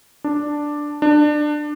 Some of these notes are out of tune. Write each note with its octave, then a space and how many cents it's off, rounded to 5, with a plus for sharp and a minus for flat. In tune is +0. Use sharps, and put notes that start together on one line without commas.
D4 +5
D4 +25